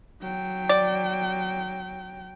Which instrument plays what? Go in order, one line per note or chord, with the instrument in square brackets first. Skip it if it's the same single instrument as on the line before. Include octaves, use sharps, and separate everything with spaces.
[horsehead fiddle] F#3 G5
[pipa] D5